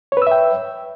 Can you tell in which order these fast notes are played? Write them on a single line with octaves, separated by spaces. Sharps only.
C#5 B4 E6 E5 G5